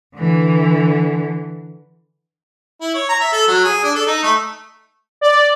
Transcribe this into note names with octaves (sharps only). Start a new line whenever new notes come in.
D3 E3
E4
C#5
A#5
E5
A4
F#3
G#4
D4
A4
D#4
A3
D5